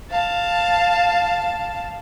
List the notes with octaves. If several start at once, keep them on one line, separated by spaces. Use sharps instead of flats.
F5 A5